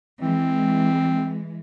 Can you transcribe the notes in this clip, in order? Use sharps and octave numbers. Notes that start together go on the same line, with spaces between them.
E3 G#3 C4